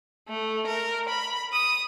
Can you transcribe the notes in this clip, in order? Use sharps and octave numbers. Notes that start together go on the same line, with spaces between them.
A3
A#4
B5
D#6